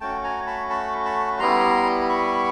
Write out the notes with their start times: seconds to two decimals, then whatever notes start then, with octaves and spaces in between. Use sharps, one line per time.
0.01 A3 C#4 F#4 G5 A5
0.24 G#5 A#5
0.47 A5 B5
0.70 A5 B5
1.05 A5 B5
1.39 G3 B3 E4 A#5 C6
2.09 B5 C#6